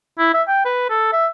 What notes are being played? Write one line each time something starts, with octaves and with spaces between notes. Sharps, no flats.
E4
E5
G5
B4
A4
E5